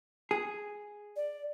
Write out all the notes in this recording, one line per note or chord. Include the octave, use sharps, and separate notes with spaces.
G#4
D5